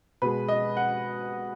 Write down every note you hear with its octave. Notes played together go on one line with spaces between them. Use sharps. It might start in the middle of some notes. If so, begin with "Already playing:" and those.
B2 G#3 B4
D#5
F#5